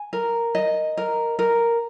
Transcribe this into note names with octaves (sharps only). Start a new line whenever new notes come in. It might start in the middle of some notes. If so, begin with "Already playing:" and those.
Already playing: G#5
A#4
D#5
A#4
A#4